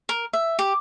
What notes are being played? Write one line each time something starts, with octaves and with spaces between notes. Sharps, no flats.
A#4
E5
G4